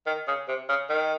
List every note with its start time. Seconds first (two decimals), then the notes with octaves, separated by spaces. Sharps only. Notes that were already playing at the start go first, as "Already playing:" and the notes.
0.07 D#3
0.28 C#3
0.48 C3
0.69 C#3
0.89 D#3